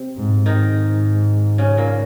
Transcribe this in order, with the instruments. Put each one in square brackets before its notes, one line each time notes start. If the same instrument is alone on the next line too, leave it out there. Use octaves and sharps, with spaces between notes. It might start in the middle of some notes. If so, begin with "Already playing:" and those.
Already playing: [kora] C3 C4
[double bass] G#2
[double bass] G#2 [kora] D#3 D#4
[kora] C#3 C#4
A#2 A#3